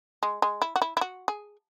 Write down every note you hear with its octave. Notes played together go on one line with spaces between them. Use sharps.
G#3
G#3
E4
F#4
E4
E4
F#4
G#4